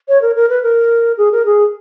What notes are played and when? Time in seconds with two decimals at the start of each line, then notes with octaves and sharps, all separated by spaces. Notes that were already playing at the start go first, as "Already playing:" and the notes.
0.08 C#5
0.22 A#4
0.36 A#4
0.49 B4
0.63 A#4
1.18 G#4
1.32 A#4
1.46 G#4